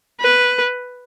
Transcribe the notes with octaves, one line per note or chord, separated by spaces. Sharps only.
B4